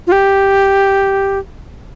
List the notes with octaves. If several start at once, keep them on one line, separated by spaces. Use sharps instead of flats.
F4
G4